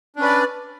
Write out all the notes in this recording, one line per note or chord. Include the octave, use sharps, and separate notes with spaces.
C#4 D4 B4 D5